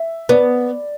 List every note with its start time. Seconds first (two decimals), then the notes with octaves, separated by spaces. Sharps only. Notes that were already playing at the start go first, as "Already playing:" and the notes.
Already playing: E5
0.29 B3 D5